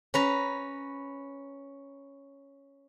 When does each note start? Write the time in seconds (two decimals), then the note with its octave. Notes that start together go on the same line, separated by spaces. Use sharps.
0.14 C#4 B4 A#5